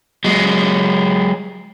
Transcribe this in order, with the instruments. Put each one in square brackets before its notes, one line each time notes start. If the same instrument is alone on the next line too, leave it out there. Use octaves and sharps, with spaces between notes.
[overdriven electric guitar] F#3 G#3